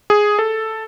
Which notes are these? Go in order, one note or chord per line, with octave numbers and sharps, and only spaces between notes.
G#4
A4